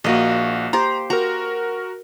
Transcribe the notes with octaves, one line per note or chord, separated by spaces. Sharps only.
A#1 A#3 F#4 D#5
G4 C5 A#5
F#4 A#4 A#5